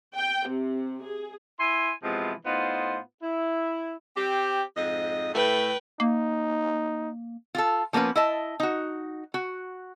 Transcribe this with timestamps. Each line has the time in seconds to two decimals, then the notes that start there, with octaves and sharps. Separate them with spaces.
0.15 G5
0.47 C3
1.04 G#4
1.59 E4 G#5 C6
2.03 C3 E3 F3 G#3 B3
2.45 A2 B3 D#4 F4 C5
3.22 E4
4.16 C4 G4
4.77 F2 G#2 D#5
5.34 A2 A3 B4 G5
6.00 A#3 D#4
7.55 F4 G4 A4
7.93 F3 A#3 B3 C#4 B4
8.16 E4 D#5 A5
8.60 D#4 F#4
9.34 F#4